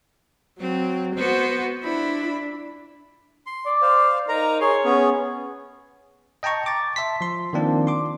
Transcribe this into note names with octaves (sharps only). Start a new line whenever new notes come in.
F#3 C4
B3 F#4 C5
D4 E4 B5
C6
D5
C5 F5
D#4 A#4 A#5
G#4 C#5 C6
B3 C#4 G#4
D#5 G5 A5 A#5 C#6
D6 A6
E5 A5 C6 B6
F3 C6
D#3 F3 A#3 C4 D4
C6 D6